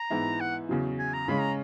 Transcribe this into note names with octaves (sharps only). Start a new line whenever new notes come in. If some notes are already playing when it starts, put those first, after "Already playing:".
Already playing: A#5
G#2 E3 B3 E4
F#5
E2 C#3 F#3
G#5
A#5
C#3 G#3 C#4 B5
A#5